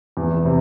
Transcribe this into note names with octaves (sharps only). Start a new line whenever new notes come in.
E2
C3